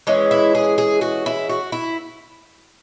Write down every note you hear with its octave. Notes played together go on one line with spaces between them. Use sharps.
E3 G#3 C#4
E4
G#4
G#4
F#4
E4
F#4
E4